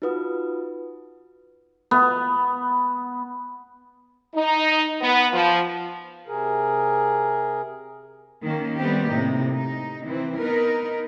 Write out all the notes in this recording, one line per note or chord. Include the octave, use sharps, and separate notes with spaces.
D#4 F4 F#4 B4 F#5 D#6
B3
D#4
B3
F3
C3 G#4 A#4
D#3 A#3 C#4
G3 A3 B3 C4 G4
A2 C3 A#3 D#4
D#4
E3 C4
B3 D#4 A#4 B4